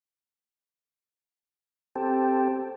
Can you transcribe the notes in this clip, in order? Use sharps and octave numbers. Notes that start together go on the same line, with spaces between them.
C4 G4 A4